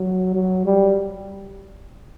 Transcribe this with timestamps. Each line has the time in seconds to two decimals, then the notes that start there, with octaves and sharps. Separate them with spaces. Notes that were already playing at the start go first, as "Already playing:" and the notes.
Already playing: F#3
0.35 F#3
0.66 G3